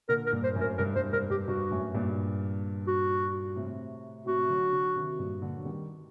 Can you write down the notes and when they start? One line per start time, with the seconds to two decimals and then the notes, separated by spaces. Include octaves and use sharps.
0.09 A#2 D3 A#4
0.27 A#4
0.33 G2 A#2
0.44 C5
0.55 F#2 A2
0.61 A#4
0.78 G2 A#4
0.96 G2 C5
1.13 G2 A#4
1.30 G2 G4
1.48 G2 F#4
1.71 F#2 A2
1.95 G2 A#2
2.87 F#4
3.56 A2 C3
4.26 A2 C3 F#4
4.49 D3 F#3
4.73 D3 F#3
4.96 C3 D#3
5.19 G2 A#2
5.42 A#2 D3
5.57 F#3
5.65 D#3 G3